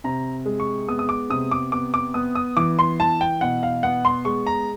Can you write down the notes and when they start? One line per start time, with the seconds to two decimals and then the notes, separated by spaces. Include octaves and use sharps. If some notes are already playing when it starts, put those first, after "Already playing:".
0.04 C3 A#5
0.46 G#3
0.60 C#6
0.88 B3 D#6
0.99 D#6
1.09 D6
1.30 C3 D#6
1.51 D6
1.72 B3 D6
1.94 D6
2.14 B3 D#6
2.35 D#6
2.57 E3 D6
2.79 C6
3.00 E3 A5
3.21 G5
3.41 B2 F#5
3.63 F5
3.83 B3 F#5
4.05 C6
4.25 G#3 C#6
4.47 A#5